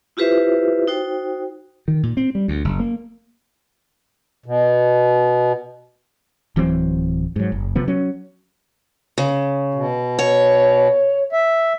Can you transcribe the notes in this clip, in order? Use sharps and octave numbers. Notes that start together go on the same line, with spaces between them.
E4 F4 G4 B4 C5 E5
D#4 F#4 C5 G5
D#3
A#2
C4
G3
D2
F#1
A#3
B2
D1 E3 F#3 C4
G#2 F#3
F#1
C3 F3 B3
F#3 C#4
C#3
B2
C#5
E5